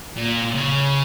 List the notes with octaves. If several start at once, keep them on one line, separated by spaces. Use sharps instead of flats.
A#2
C#3